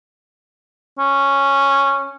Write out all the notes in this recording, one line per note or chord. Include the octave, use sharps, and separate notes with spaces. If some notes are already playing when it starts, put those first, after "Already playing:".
C#4